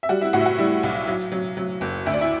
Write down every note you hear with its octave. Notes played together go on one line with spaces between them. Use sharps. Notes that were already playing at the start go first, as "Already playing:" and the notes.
E5
G3 F#4 F#5
E4 E5
A2 F#4 F#5
E5
F#4 F#5
G3 E4 E5
B1
F#3
F#3
F#3
F#1
D2 E5
D5
E4 E5